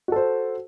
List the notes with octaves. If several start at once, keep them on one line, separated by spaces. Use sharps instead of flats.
F#4 A4 C5